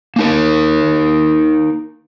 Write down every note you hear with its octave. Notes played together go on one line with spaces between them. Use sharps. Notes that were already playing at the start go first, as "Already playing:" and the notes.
A#3 D#4 A#4